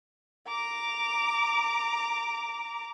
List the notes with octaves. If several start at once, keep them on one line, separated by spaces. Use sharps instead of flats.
A#5 D6